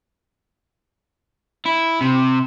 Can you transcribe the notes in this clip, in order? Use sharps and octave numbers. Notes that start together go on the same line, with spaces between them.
E4
C3